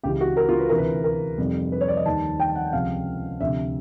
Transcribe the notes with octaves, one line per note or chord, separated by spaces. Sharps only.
C#2 C#3 E3 G4
F#4
A#4
F4
B4
D2 C3 E3 A#4
B4
A#4
F2 C3 D#3 G3
B4
C#5
D5
D#5
D#2 D#3 G3 A5
G5
F#5
C#2 C3 F3 F5
D2 C3 F3 E5